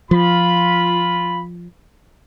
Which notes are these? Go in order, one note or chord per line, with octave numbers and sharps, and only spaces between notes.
F3 F4 B5